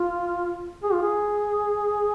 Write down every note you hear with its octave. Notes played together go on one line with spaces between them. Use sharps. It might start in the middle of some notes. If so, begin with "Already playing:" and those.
Already playing: F4
G#4
F4
G#4